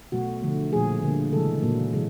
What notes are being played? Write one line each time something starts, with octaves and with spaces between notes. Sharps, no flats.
B2 F#3 A3 F#4
D3 F3 A3
A#2 F3 A3 G#4
D3 G3 A#3
C#3 E3 G#3 A4
A#2 F#3 A#3
C3 E3 G#3